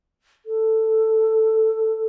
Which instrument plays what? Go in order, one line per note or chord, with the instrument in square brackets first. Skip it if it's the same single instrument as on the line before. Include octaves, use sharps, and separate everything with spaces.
[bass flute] A4